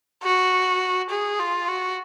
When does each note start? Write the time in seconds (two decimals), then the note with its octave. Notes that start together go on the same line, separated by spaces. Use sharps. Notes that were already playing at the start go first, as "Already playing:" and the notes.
0.23 F#4
1.10 G#4
1.39 F4
1.68 F#4